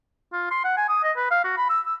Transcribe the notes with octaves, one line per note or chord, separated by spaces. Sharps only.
F4
C6
F#5
G#5
D#6
D#5
B4
F5
F#4
B5
E6
E6